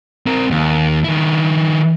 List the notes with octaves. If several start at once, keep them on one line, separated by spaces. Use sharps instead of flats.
C4 A#4
D#2
D#3 E4